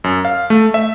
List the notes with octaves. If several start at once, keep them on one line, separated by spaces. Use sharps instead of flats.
F#2
F5
A3
E5